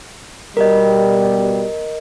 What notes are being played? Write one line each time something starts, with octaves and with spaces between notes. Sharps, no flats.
B2 G3 A#4 D#5